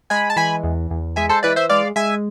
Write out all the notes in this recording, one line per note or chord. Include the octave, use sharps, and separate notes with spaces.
G#3 G#5 B5
A5
E3 G#5 B5
E2
E2
G#3 E5 G#5
A4 C5
E3 B4 D5
C5 E5
G#3 D5 F5
G#3 E5 G#5